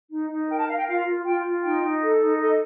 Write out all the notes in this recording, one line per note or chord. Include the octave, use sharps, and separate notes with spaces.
D#4
D#4
A#4 G5
A5
A#4 F5
G5
F4 F5
F4
F4 G5
F4
D#4 G5
D#4
A4
D#4
A4 D#5